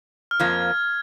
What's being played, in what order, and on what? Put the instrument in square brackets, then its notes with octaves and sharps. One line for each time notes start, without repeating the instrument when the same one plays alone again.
[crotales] F6
[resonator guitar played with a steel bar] F2 F3 A#3 [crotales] G#6